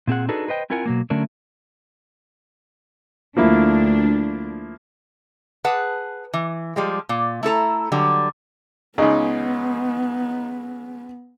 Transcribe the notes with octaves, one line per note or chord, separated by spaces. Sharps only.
A#2 C4 G#4 F#5
D4 D#4 F#4 G#4 A4 B4
B4 C5 D#5 G5
C4 E4 F4 A#4 F#5 G#5
B2 F#3 A#3
D3 F#3 A3 C#4 D4 A#4
D2 F3 A#3 D4 E4
G#4 B4 F#5 A5
E3
F3 G3 G#3
A#2
A3 E4 A4 A#5
D3 F#3 G3
C#2 C#3 B3 D#4 D#5